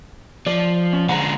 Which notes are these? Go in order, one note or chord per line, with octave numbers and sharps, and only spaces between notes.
F3 D5
C#4
D3 G#3 F#5 A#5